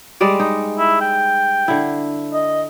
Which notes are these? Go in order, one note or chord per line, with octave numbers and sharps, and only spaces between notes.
G3 G#3 D5
D#4
E4
G5
D3 E4
D#5